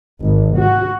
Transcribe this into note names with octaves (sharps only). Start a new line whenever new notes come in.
G#1
F#4